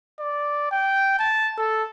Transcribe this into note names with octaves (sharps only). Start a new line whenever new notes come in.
D5
G5
A5
A4